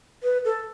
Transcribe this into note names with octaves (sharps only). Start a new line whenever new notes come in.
B4
A4